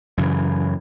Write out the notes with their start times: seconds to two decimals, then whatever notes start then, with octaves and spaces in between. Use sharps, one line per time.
0.17 F#2 C#3 E3